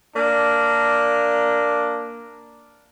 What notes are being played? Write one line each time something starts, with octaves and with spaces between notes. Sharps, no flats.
A#3 D4